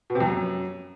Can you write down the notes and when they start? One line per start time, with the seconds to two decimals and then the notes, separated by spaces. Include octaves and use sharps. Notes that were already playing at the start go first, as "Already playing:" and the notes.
0.10 B2
0.15 C3
0.20 F2
0.26 F#2